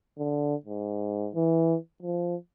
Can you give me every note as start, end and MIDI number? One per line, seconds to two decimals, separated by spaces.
0.18 0.55 50
0.66 1.29 44
1.35 1.76 52
2.02 2.35 53